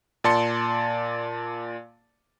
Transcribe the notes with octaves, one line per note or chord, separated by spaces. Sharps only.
A#2 D5 A5 C6 C#7